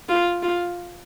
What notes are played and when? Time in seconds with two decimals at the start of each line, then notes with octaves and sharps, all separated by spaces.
0.09 F4
0.42 F4